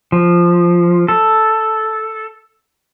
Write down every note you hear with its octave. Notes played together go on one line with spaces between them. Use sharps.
F3
A4